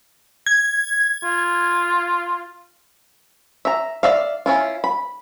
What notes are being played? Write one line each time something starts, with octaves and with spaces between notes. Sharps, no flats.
G#6
F4
E5 A#5
D5 E5 F5
C#4 E4 F4
B5